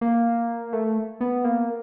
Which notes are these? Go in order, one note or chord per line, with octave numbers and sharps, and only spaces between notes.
A#3
A3
B3
A#3